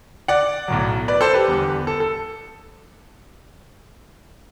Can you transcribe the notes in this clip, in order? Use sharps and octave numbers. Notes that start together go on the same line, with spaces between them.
D5 F#5
B1 A2 F#3
B4 D5
A4 C5
G4 B4
E2 D3 G3
A4
A4